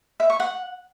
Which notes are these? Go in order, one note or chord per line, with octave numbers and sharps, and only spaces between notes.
E5
C#6
F#5